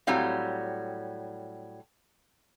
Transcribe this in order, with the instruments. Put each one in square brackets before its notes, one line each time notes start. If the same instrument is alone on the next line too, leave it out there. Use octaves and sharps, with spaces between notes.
[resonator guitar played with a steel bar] A2 F#3 G3 C4 F5